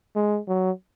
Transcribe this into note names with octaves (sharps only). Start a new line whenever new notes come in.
G#3
F#3